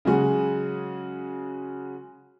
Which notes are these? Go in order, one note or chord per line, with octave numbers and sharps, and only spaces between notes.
C#3 F#3 G#3 F#4 G#4